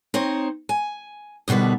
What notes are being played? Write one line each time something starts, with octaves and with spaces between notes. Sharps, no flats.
C4 D#4 C5 C#5
G#5
D#2 B2 D3 G3 B4